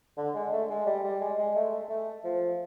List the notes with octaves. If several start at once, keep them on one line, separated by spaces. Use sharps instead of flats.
D3
G#3
A3
G#3
G3
G3
G#3
G#3
A3
A3
F3